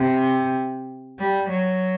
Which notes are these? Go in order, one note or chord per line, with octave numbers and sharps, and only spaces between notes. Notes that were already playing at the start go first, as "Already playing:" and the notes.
Already playing: C3
G3
F#3